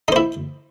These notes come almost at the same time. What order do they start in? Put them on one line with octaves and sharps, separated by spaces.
D#4 C5 E4